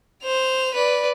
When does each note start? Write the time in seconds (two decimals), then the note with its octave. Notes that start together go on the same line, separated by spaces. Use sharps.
0.24 C5 F7
0.74 B4 D5